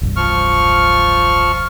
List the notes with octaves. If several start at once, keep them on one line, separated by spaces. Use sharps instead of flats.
E1 C2 G2
F3 C#6 F6